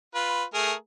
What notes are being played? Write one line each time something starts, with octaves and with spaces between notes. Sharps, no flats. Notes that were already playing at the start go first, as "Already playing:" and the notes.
F4 B4
A3 G#4 A#4